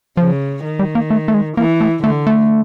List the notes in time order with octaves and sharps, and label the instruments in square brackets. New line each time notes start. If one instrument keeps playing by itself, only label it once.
[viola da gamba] C#3 [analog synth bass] F3
[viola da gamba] D#3
[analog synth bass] G3
A#3
A3
A3
G#3
[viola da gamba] E3 [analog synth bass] A#3
[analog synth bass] A3
[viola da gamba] D3 [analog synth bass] A3
[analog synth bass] A3